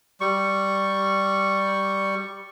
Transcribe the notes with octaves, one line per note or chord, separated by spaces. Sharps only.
G3 C#6